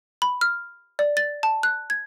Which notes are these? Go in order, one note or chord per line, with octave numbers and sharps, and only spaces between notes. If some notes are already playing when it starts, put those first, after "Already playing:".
B5
F6
D5
A6
A5
F#6
G#6